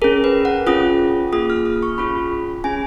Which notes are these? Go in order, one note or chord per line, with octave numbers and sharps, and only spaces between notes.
C#4 G#4 A#4
B4
F#5
C#4 F4 G#4 D#6
A#3 F4 G#4 D#6
F6
D#6
C#6
C#4 F4 G#4 B5
C#4 G#4 G#5